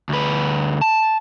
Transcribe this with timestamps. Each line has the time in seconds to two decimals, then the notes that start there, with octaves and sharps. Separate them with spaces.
0.09 D2 B4
0.81 A5